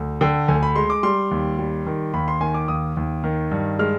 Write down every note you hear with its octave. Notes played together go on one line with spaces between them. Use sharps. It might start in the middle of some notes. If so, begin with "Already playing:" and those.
Already playing: D2
D3 G5
D2 G#5
B5
G#3 C6
D6
G3 C6
D#2
G3
D#3
D#2 B5
C6
D#3 G#5
D6
D#2 D#6
D#2
D#3
G2
G#3 F6